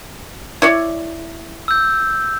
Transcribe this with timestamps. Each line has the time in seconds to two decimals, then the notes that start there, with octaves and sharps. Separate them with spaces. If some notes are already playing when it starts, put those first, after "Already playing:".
0.62 E4 C#5 D5
1.68 E6 G6